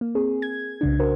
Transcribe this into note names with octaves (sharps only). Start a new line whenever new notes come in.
A#3
C4 G#4
G#6
C2 C#3 D4
D4 F#4 A#4 C5